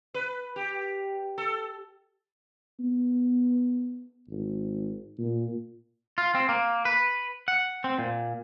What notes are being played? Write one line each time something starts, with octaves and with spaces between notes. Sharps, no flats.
B4
G4
A4
B3
G#1
A#2
F4
C4
A#3
B4
F#5
C4
A#2